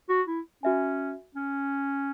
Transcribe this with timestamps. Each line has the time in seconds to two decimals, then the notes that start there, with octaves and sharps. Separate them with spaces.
0.09 F#4
0.27 E4
0.63 C#4 F#4 E5 G#5
1.35 C#4